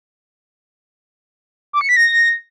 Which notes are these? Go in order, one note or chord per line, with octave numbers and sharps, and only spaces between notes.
D6
C#7
B6
A#6